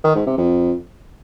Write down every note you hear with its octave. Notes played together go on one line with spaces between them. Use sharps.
D#3
G#2
C3
F2